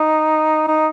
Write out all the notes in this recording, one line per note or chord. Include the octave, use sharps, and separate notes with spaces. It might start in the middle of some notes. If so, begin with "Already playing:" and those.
Already playing: D#4
D#4